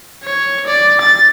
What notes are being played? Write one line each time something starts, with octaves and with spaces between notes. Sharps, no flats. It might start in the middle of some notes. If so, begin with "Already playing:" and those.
C#5
D5
A6